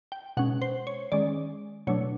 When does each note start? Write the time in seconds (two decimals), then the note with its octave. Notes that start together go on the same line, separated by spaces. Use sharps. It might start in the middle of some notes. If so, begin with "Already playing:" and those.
0.12 G5
0.37 B2 G#3 C#4 F#5
0.62 C5
0.87 C#5
1.12 D#3 G#3 C#4 D5
1.87 B2 F#3 A3 D4 C#5